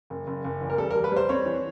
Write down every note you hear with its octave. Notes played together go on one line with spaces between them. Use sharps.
F#1
F#1
F#1
E2
A#4
G3 A4
G3 A#4
B4
G3 C5
C4 C#5
E3